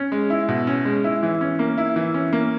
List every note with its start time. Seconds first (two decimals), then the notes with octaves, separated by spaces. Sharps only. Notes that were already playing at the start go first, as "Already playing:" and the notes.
Already playing: C#4
0.12 G#3
0.30 E4
0.49 B2
0.67 C#4
0.85 G#3
1.04 E4
1.23 E3
1.41 C#4
1.59 A#3
1.78 E4
1.96 E3
2.14 C#4
2.33 A#3